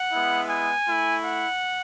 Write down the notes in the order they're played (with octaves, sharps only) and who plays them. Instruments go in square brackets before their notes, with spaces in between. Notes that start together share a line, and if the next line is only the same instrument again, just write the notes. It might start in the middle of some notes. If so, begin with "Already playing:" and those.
Already playing: [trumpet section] F#5
G#3 B3 E4
G#5
A3 E4
F#5